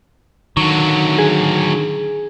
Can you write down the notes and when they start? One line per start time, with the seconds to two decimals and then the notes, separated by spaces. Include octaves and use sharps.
0.57 D3 D#3 F#3 C#6
1.18 G#4